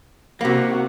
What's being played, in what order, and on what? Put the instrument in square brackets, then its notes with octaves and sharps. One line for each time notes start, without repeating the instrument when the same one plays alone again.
[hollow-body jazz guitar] C3 A#3 [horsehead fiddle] F#4